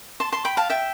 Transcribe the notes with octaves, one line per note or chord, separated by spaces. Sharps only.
A5 C6
A5 C6
G5 B5
F5 A5
E5 G5